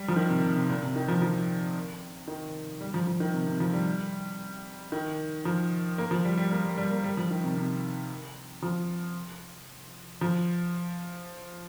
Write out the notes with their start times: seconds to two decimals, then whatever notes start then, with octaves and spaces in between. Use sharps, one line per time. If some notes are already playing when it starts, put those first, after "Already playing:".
Already playing: G3
0.08 F3
0.16 D#3
0.29 C3
0.43 C3
0.56 C3
0.69 A#2
0.83 C3
0.96 D#3
1.08 F3
1.22 F3
2.28 D#3
2.81 G3
2.94 F3
3.07 F3
3.20 D#3
3.34 C3
3.47 C3
3.60 F3
3.73 G3
4.92 D#3
5.45 F3
5.98 A#3
6.11 F3
6.25 G3
6.37 G3
6.51 A#3
6.64 G3
6.77 G3
6.91 A#3
7.04 G3
7.17 F3
7.31 D#3
7.44 C3
7.57 C3
8.62 F3
10.21 F3